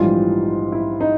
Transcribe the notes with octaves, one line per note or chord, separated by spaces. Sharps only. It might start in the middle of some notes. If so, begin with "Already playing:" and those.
Already playing: A#1 G#2 E3 G3 F4
E4
D#4